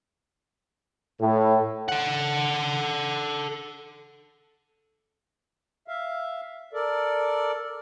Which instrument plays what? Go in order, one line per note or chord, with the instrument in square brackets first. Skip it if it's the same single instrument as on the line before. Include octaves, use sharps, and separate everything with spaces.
[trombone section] A2
[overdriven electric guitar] A4 F#5
[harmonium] E5 F5
A4 A#4 D5